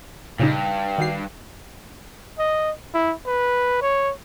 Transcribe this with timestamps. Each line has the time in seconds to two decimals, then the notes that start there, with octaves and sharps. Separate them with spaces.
0.39 G2 A#2 C#3 D#4
0.98 D#3 F#4 C7
2.38 D#5
2.94 E4
3.26 B4
3.82 C#5